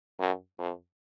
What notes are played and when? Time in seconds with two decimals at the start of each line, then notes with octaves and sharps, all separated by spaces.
0.19 F#2
0.59 F2